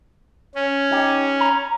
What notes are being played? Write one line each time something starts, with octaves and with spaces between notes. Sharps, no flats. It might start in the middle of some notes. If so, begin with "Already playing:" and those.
C#4
D#4 G4
A#5